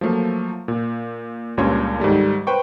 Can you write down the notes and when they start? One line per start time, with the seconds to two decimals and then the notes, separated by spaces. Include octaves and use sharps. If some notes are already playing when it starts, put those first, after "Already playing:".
0.01 F3 F#3 A3 A#3
0.68 A#2
1.57 C#2 G2 A#2 C#4 C#5 C6
2.00 G#2 D#3 G3 A3
2.47 B4 C5 G5 C#6